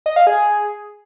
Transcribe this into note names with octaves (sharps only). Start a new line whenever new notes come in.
D#5
F5
G#4